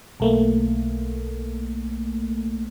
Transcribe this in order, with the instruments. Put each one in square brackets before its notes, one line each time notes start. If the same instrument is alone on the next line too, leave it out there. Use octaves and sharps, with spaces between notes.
[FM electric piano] B1 A3 A#3